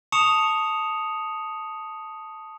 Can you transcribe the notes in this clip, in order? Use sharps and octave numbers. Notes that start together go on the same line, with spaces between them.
A5 C#6 D#6 C#7 E7 F7